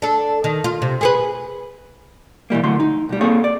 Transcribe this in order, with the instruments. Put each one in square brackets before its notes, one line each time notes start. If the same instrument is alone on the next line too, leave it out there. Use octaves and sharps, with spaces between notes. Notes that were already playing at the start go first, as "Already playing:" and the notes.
[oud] D4 A4
D#3
F4
C3
G#4 A4 B4
[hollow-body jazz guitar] B2 E3 G3 A#3
D2 A2 D3 F#3 C6
D#4
B1 G3
A#3 C4 G#4 A4 C#5
D5